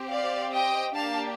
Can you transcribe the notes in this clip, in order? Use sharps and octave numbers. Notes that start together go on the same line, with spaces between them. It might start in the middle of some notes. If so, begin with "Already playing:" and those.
Already playing: C4 G4
D5 F5
D#5 G5
A#3 D4 G4 F5 A5